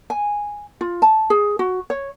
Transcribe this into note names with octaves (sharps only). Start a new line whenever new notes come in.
G#5
F4
A5
G#4
F#4
C#5